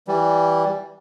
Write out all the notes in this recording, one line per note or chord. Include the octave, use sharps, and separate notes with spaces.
E3 G3